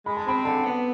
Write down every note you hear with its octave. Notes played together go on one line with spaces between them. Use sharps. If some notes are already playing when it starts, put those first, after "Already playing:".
G#3 B5
A5
C4 B5
D3 A5
B3